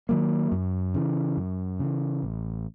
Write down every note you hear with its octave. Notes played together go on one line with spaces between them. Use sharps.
D#3 F#3 A#3
F#2
C#3 E3
F#2
C#3 E3
A1